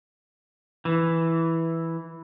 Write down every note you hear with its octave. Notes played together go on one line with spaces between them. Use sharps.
E3